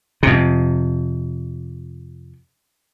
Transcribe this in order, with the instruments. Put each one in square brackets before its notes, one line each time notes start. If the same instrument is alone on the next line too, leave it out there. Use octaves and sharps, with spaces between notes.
[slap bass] F2 C3